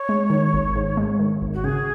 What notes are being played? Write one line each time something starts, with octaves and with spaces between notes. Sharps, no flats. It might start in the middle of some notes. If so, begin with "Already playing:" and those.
Already playing: C#5
G#3
D#3
G#1
G#2
G#3
D#3
G#1
F#4
C#3 G#4